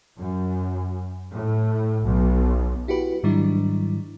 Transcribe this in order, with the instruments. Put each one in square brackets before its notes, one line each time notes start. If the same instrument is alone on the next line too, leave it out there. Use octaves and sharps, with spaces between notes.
[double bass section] F#2
A2
B1
[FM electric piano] E4 F#4 G4 B4
G#2 D#3 F#3 G3 D4 E4